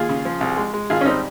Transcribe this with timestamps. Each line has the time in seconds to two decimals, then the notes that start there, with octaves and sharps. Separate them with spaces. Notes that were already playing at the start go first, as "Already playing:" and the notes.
Already playing: D#2 F4 G#4
0.09 C#3
0.25 F3
0.41 C2
0.57 G#3
0.74 G#3
0.90 G#1 F4 G#4
1.01 C#4
1.05 G3 C4 D#4